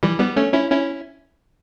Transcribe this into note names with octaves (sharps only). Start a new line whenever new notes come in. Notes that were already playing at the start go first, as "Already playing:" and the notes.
E3 G3
G3 B3
A3 C#4
C#4 E4
C#4 E4